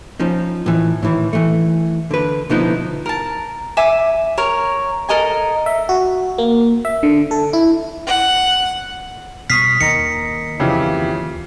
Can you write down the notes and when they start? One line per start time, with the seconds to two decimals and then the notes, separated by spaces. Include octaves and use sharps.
0.20 F3 C#4 D#4
0.66 A2 E3
1.02 A2 D#3 E3
1.33 E3 A3
2.11 D3 B4
2.50 B2 D3 F3 B3 D#4 E4
3.06 A#4 A5
3.77 E5 G#5 D6
4.38 A#4 C#5
5.09 A4 A#4 D#5 G#5
5.66 E5
5.89 F#4
6.38 A#3
6.85 E5
7.03 D3
7.31 A4
7.53 E4
8.07 F#5
9.50 B2 G3 C#6 D#6 F6 B6 C7
9.81 D#2 D#3 D#5 A#5 C#7
10.60 F2 C#3 E3 F3 G4 E5